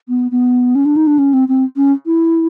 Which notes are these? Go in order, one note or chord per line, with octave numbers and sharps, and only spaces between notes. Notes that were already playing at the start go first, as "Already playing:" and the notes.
B3
B3
C#4
D4
D#4
D4
C#4
C4
C4
C#4
E4